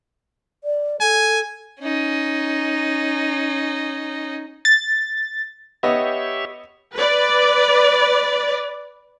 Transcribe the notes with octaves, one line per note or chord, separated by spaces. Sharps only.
D5
A4 G#5
C#4 D#4
A6
B3 G4 C#5 D#5 E5
B4 D5